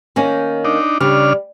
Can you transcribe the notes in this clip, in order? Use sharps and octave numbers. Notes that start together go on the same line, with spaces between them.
D#3 A#3 C#4
D4 D#4
C#3 G3 D4 F6